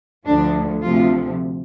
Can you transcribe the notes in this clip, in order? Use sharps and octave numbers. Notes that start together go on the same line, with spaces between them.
D2 D3 F3 D4
D2 C3 F3 F4